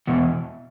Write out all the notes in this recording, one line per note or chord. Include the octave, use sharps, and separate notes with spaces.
E2 B2